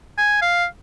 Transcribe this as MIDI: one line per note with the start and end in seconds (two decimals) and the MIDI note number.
0.18 0.38 80
0.42 0.65 77